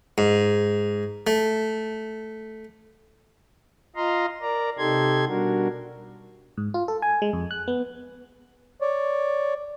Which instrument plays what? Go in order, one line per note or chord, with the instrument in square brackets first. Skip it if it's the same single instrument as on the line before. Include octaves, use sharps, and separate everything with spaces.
[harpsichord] G#2
A3
[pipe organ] F4 D#5 F5 A#5 C6
A#4 D5 A#5
C3 D#4 G4 A4 C6 G#6
B2 G3 D4 F#4 A#4
[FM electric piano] G#2
F4
A4
G#5
G#3
F2
F#6
B3
[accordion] C#5 D5